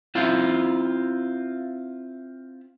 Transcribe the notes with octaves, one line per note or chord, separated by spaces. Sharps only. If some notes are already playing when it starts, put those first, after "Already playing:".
C4 E4 F4